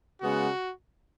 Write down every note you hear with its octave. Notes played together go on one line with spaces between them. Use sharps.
C#3 G#3 B3 F#4